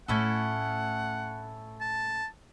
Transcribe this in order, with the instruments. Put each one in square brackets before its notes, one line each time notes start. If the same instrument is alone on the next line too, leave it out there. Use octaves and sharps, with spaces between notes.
[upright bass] A2 A3 [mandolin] C#4 E4 A4 [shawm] F#5
[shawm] A5